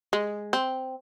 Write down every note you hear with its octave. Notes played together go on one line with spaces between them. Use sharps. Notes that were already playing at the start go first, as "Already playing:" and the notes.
G#3
C4